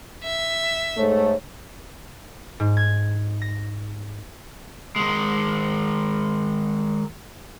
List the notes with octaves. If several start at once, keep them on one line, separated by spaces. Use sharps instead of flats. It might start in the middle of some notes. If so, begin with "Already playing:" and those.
E5
G#2 A3 C#5
G#2
G#6
A#6
D#3 G#3